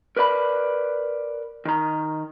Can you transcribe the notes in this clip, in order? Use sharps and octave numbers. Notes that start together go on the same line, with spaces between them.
A#4 B4 D5 F#5 B5
D#3 A#5